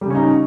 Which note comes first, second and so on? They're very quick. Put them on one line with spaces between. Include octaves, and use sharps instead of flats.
G3 C#3 C#4 D#4